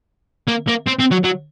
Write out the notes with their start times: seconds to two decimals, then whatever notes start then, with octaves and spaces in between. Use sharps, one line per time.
0.48 A#3
0.68 A#3
0.87 C4
0.99 C4
1.11 F#3
1.24 F#3